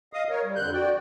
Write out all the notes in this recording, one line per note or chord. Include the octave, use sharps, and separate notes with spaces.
D#5 F5 D#6
A#4 C#5
G3
F2 D3 F#6 G6
F#4 D5 G5